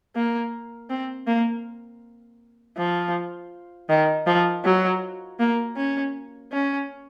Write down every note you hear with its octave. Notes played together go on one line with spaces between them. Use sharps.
A#3
C4
A#3
F3
D#3
F3
F#3
A#3
C#4
C#4